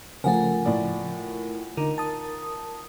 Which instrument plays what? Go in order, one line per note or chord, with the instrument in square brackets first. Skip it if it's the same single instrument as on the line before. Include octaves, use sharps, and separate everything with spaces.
[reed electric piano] C#3 F3 [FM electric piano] A3 A#4 [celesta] F4 F#5 G#5
[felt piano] A2 D5
[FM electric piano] D3 [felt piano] D#4 [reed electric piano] A#4
[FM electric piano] A5 D#6